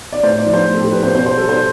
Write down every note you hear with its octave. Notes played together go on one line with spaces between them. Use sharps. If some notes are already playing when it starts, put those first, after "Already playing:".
D5
A2 C5
D5
F3
C5
A2
A4
G4
F3 B4
C5
B2 C5
C5
G3 A4
C5